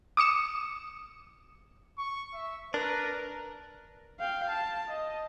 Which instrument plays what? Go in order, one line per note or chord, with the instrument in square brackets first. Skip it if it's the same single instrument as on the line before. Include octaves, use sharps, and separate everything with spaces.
[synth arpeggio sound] D6 D#6 C#7 E7
[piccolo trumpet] C#6
E5
[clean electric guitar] D4 [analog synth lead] A#4 [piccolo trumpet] B4
[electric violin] F5 G5
A5
D#5